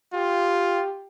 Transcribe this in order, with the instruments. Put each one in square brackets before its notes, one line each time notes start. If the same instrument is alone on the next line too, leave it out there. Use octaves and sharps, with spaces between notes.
[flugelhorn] F4 [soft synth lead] G4